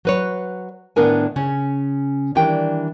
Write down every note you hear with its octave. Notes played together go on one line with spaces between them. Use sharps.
F#3 B4 C#5
A2 D#3 B3 D4 A#4 G#5
C#3 C#4
D#3 E3 G3 D4 G5